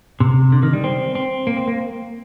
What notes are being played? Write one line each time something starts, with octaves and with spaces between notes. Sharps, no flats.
C3
D3
D#3
G3
C4
C4
A#3
C4
A#3